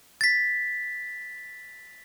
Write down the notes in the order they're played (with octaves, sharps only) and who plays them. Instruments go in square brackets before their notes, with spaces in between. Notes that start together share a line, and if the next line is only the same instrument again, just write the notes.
[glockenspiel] A6 B6